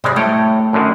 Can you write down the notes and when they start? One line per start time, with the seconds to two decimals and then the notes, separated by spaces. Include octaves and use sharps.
0.04 C3 G3 G#3 D5
0.16 A2 A3 C#5 G5
0.73 F#2 D3 D#3